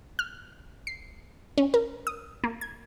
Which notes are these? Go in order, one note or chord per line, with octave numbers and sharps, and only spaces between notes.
F6
C7
C#4
A#4
D#6
A#3
G#6